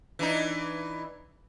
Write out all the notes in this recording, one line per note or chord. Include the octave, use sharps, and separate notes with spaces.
E3 D4 D#4